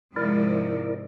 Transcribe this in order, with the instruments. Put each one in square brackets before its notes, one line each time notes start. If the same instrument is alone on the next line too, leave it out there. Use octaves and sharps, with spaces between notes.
[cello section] G#2 C3 F3 [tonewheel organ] E4 A#4 D5